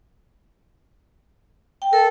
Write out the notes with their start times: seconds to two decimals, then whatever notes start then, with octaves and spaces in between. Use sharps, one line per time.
1.82 G5
1.93 A4 A#4